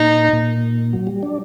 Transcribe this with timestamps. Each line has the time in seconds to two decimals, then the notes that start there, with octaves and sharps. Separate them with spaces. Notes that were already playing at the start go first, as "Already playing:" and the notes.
Already playing: A#2 D#4
0.33 A#2
0.93 F#3
1.07 G3
1.23 D4